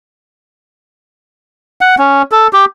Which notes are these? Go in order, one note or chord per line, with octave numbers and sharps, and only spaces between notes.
F#5
C#4
A4
G4